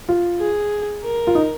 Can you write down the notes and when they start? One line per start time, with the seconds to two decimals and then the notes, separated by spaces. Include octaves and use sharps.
0.09 F4
0.40 G#4
1.03 A#4
1.27 F4
1.35 D#4